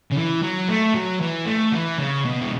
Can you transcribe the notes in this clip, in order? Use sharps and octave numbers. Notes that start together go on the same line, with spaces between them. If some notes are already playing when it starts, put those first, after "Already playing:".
C#3
E3
F#3
A3
F#3
E3
A3
E3
C#3
B2
E3